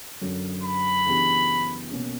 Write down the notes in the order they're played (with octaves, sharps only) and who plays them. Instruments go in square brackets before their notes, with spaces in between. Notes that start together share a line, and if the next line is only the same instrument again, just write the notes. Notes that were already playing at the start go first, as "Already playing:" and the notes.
[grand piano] F#2 D3 F#3 C#4
[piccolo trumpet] B5
[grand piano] C#3 E3 B3 D4 G4
B2 A#3 C#4